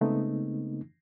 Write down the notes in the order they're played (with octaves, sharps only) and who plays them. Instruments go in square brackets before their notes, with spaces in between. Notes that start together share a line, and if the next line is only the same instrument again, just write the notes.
[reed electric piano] C#3 G#3 A3 B3 C4 D#4